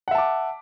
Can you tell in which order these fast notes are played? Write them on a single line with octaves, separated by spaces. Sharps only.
F#5 E5 A5 D6